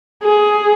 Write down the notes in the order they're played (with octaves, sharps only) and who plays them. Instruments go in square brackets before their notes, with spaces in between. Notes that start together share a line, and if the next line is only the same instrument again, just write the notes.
[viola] G#4